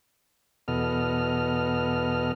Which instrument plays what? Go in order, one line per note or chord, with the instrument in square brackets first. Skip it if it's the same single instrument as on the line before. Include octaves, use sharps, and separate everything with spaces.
[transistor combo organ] E2 B2 B3 A4 D#5 F6